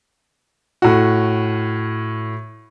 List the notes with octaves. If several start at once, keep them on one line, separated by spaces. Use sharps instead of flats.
A2 F#4